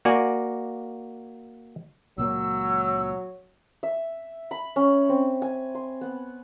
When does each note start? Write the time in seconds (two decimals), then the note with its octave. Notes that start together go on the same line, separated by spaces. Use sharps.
0.05 A#3 F#4 D5 G#5
2.18 C#2 A#2 F#3 A#3 E6
3.83 E5
4.51 B5
4.76 C#4
5.09 C4
5.42 G#5
5.75 C6
6.01 B3